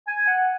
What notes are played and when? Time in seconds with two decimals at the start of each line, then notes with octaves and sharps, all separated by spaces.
0.07 G#5
0.27 F#5